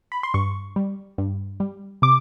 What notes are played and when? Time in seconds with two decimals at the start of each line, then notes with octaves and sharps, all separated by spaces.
0.12 B5
0.23 C6
0.34 G2 C#6
0.76 G3
1.18 G2
1.60 G3
2.02 C3 D6